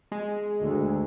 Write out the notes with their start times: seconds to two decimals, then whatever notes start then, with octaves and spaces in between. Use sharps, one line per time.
0.12 G#3
0.62 D2